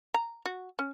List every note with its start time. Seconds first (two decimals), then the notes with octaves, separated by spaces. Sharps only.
0.14 A#5
0.45 F#4
0.79 C#4